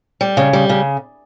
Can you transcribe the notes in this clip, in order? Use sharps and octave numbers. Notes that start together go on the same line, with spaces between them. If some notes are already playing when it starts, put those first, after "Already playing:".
G3
C#3
G3
C#3